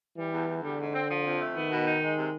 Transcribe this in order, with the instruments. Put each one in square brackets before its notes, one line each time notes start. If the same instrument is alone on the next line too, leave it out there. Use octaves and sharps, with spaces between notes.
[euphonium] E3 [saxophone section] G3
[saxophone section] E2
E2
[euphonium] D3 [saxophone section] G3
[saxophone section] G#2
C4
F3
F2
A3
[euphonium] D#3 [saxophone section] B3
[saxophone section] B2
D#4
G#3
C3